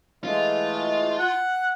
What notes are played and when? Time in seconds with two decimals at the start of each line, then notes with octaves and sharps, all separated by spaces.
0.24 E3 G#3 A3 F4
1.20 F#5